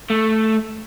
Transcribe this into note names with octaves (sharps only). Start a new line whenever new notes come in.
A3